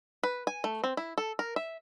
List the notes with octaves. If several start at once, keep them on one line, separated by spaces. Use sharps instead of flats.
B4
G#5
A3
C4
E4
A4
A#4
E5